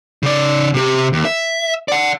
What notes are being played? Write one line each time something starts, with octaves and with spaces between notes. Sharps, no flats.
C#3 D5
C3 G4
D#2
E5
D5 F#5